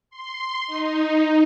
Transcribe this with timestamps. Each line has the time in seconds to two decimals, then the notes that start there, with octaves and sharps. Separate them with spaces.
0.10 C6
0.67 D#4